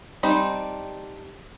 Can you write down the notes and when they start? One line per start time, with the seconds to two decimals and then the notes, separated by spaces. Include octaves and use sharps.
0.23 G3 C4 D4 D#4